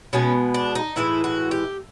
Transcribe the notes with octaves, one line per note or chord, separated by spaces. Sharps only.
B2 G#3 B3 C#4
D4
D#4
A2 E3 G#3 E4
F#4
G4